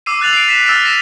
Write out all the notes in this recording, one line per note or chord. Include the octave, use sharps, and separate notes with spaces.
D6 E6 C7 D#7
E6 F#6 A6 F7 F#7
C7 D7
B6 E7
E6 F6 A6 B6 D7 E7
A#6 C7 E7